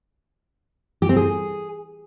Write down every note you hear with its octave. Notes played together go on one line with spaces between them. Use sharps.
G4
C4
G#4